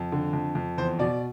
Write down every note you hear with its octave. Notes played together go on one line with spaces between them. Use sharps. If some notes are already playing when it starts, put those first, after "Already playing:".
Already playing: F2
D3
F2
F2
E2 C5
B2 D5